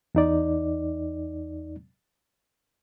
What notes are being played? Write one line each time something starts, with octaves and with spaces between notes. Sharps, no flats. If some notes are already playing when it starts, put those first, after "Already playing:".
E2 D#4 D5